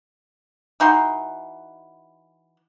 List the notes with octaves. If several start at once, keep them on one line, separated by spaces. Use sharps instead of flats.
E3 D#4 F#4 C6